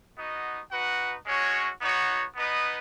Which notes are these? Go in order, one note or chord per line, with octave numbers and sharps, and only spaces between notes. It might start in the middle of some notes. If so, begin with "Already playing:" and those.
B3 D#4 F#4 D#5
D#4 F#4 B4 F#5
G#3 C#4 F#4 C#5
B3 D#4 F#4 C#5
B3 D#4 B4 D#5